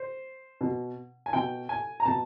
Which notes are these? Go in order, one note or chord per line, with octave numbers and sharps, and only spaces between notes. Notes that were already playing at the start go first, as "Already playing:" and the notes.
Already playing: C5
B2
G#5
B2 G5
G#5
A#5
B2 A5